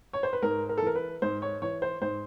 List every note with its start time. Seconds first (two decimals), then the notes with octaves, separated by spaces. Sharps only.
0.13 C#5
0.23 C5
0.33 B4
0.42 G#2 A#4
0.69 A#4
0.78 A4
0.82 E3 A#4
0.96 B4
1.22 G#2 C5
1.42 C#5
1.62 E3 C#5
1.82 C5
2.01 G#2 C5